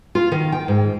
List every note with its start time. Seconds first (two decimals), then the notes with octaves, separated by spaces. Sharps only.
0.15 F4
0.32 D#3
0.52 G5
0.68 G#2